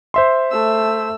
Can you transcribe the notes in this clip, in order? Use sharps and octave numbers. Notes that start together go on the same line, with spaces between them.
C5 E5 C6
A3 E6